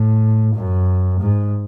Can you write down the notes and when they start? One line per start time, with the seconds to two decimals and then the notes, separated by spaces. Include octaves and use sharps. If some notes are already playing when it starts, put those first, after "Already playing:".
Already playing: A2
0.54 F#2
1.20 G#2